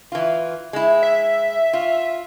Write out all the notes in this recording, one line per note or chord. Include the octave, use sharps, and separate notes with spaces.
E3 F4
G#3 E4
E5
F4